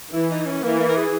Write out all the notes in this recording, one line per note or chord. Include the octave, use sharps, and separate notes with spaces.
E3 E4
D#4
C#4
E3 A#3
A#3
A#4
G#4